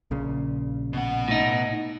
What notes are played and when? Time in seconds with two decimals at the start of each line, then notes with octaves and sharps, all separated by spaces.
0.11 A#1 A#2 C#3
0.93 B2 F#5
1.28 A2 D#4